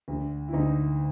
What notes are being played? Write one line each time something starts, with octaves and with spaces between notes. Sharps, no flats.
D2 D3
E4
D2 D3 D#4